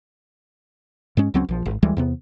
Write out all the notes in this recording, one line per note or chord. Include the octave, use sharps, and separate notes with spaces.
G#2 G#3 C#4
C#2 F#3 C4 C#4
A#1 F3
G#1
D2 E3 G3 G#3
E2 C3 B3